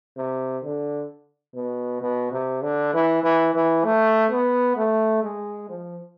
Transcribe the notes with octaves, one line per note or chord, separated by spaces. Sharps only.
C3
D3
B2
B2
C3
D3
E3
E3
E3
A3
B3
A3
G#3
F3